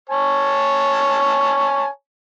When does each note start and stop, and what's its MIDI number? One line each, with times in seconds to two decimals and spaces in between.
0.09 1.88 73
0.09 1.88 80
0.09 1.88 81